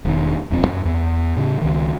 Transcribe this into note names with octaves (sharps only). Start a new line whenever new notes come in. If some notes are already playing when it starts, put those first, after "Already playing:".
E1 D#3
D#1 F2 C4
F#2
E2
A2 C#3
C#2 D#3